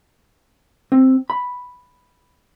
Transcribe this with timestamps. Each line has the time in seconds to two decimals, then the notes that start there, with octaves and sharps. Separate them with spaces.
0.92 C4
1.30 B5